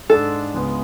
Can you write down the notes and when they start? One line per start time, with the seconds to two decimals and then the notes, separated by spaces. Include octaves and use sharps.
0.10 G#2 G#3 D4 A4
0.54 C#2 C#3 G#3 B3